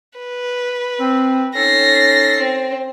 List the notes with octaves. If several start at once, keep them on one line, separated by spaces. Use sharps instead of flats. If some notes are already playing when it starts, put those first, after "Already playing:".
B4
C4
C#4 D#4 A4 A#6 C7
C4